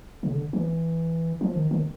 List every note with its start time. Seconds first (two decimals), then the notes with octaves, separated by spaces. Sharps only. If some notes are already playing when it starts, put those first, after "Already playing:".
0.23 C#3
0.33 D3
0.53 E3
1.41 F3
1.56 D#3
1.71 D#3